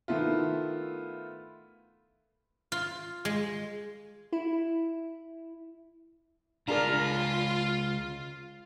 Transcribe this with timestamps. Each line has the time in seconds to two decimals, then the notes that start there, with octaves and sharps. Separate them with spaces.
0.08 D#3 A3 B3 E4 F4
2.72 F4
3.25 G#3
4.33 E4
6.68 C#2 D4 F4 G#4 A#4 A#5